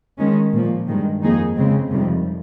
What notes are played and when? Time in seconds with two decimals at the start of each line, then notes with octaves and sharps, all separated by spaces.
0.18 D#3 G#3 C#4
0.52 A#2 F3 A#3
0.88 G2 D#3 G#3
1.22 F2 D#3 A#3 D#4 G#4
1.57 C#3 G#3 C4
1.91 F2 C3 D#3 G3